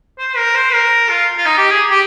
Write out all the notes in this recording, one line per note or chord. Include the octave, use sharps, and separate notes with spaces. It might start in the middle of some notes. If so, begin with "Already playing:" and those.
C5
A#4
C5
A#4
F4
F4
D#4
G4
G#4
G4